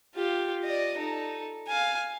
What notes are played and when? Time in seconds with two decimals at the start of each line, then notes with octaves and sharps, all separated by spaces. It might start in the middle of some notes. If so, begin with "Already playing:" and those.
0.15 F4 G4
0.65 D5 D#5
0.98 D#4 A4
1.68 F5 G#5